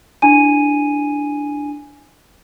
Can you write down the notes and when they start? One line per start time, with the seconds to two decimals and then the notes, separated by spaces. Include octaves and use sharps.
0.22 D4 E4 G#5 D#7